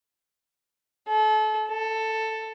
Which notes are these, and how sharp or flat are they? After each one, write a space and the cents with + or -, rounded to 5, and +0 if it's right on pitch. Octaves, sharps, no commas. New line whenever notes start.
A4 -35
A4 +10